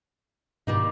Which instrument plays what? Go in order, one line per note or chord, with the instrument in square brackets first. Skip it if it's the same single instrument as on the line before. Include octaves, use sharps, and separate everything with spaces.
[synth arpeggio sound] G#2 B2 D#3 [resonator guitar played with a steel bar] G3 A#3 D#4